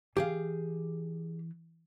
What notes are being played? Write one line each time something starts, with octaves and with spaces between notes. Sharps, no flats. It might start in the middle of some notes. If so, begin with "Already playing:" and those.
E3 G4 G#4 F5